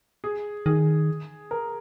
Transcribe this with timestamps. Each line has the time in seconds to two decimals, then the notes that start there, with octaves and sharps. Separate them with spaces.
0.24 G#4
0.66 D#3 G#4
1.51 A#4